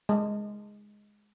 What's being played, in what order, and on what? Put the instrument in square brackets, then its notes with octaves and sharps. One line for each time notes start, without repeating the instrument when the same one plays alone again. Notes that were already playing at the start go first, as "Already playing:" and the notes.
[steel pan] G#3